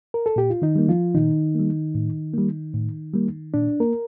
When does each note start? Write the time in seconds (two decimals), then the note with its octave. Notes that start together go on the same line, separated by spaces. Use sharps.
0.14 A#4
0.26 A4
0.36 A#2 G4
0.50 F4
0.62 D#3 D#4
0.76 G3 A#3
0.88 F3 F4
1.15 A#2 D#3 D#4
1.55 G3 A#3
1.95 A2
2.34 G3 A#3
2.74 A2
3.13 G3 A#3
3.54 A#2 D4
3.80 A#3 A#4